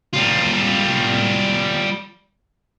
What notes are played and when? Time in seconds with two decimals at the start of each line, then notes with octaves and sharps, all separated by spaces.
0.13 G3 F4